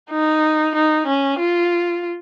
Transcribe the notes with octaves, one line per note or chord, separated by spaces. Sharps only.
D#4
D#4
C#4
F4